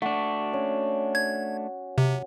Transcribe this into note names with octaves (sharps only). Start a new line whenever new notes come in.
A3 D4 F#4
C#4
G#6
C3